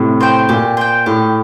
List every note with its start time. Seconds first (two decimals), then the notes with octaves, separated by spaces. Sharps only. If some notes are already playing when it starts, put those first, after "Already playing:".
Already playing: A2 C3
0.20 C5 G5
0.49 A#2 G4
0.77 C5 G5
1.06 A2 G4